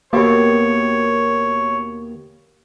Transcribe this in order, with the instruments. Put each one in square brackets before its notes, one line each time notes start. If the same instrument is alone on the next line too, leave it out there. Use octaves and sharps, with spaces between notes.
[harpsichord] D#2 B2 [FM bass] A#3 [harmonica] C#5